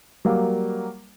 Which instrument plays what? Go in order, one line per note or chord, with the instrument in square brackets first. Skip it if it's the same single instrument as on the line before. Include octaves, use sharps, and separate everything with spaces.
[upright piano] F#3 G3 A#3